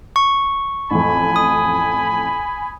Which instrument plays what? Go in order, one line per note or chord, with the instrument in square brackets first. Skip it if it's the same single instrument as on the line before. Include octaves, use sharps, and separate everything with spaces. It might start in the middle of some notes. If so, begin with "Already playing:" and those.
[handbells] C#6
[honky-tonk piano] A1 F2 [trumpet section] G#5 B5
[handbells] D#6